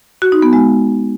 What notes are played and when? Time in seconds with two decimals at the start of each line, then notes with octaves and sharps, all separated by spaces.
0.22 F#4
0.32 D#4
0.42 B3
0.53 G#3